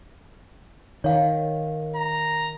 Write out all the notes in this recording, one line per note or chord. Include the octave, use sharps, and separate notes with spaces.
D#3 C#5 F5
A#5